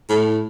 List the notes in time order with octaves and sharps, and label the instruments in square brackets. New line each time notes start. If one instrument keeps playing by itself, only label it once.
[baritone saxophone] A2